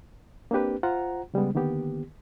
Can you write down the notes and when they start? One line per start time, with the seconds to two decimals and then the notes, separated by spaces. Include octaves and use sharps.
0.51 A#3 C4 D4 G4 B4
0.83 F4 C5 F#5 A#5
1.34 C#3 G3 G#3 B3
1.55 D3 D#3 A#3 B3 G4